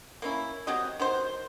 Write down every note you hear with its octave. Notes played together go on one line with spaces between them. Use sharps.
A#3 C#4 E4
F#3 C4 G4 D#5
D#3 F#3 C5